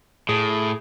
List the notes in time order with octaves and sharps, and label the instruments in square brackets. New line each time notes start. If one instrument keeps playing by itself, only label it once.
[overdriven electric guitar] A2 [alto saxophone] G#4